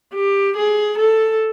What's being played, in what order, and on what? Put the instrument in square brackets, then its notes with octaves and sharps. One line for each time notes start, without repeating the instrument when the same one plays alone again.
[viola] G4
G#4
A4